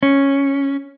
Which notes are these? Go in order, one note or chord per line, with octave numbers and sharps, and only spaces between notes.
C#4